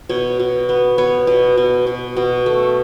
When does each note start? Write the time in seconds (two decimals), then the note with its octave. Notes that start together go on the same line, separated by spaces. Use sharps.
0.09 B2 C#5
0.40 B2
0.69 B3
0.98 B3 C#5
1.27 B2
1.57 B2
1.87 B2
2.16 B2
2.46 A3